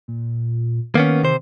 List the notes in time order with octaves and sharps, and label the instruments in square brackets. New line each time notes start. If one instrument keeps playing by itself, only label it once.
[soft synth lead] A#2
[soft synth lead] D#3 [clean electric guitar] A#3 B3 C#4
[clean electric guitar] C3 C5